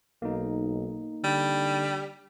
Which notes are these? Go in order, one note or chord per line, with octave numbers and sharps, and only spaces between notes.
B1 A#3 D#4
D3 G3